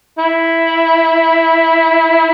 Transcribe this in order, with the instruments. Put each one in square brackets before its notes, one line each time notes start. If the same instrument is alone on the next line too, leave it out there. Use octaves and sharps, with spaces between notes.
[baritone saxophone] E4